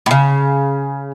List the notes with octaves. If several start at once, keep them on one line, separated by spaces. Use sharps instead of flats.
A2 C#3